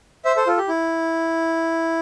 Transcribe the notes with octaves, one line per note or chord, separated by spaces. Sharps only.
C5 E5
A4 C5
F4 A4
G4
E4